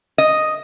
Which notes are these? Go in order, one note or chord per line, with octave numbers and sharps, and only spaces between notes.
D#5